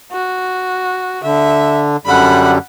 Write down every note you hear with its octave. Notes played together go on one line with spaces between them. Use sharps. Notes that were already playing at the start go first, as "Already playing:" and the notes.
F#4
D3 E5
F#2 D3 G3 F#5 B5